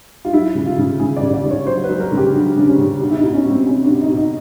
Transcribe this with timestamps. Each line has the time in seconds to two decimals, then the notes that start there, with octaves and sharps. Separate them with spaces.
0.25 F4
0.33 F#3 E4
0.55 C#3
0.66 F4
0.78 C#3
1.00 C#3 G#4
1.16 D5
1.22 C#3
1.34 D5
1.44 C#3
1.51 C#5
1.67 F#3 C5
1.84 B4
1.89 F#3
2.00 A#4
2.12 C#3
2.17 G4
2.34 F#3 D4
2.56 C#3 D4
2.67 C#4
2.78 C#3
3.00 B2 D4
3.11 E4
3.17 D#4
3.23 B2
3.34 C#4
3.45 B2
3.50 C4
3.67 B2 C#4
3.84 D4
3.89 B2
4.01 D#4
4.12 B2 D#4